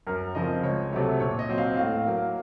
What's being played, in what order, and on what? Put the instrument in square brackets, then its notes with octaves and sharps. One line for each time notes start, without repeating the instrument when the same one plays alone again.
[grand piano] F#2 A#4
C#3 F3 C4 D#5
C#2 C#5
C3 F#3 A3
A#2 C#5
D#5
F#3 C4
F5
A2 F5
F#3 A#3